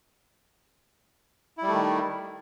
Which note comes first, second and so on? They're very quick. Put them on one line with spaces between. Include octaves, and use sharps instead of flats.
E4 G3 A3 D#3